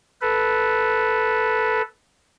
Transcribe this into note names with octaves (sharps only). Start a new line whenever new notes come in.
A4 B4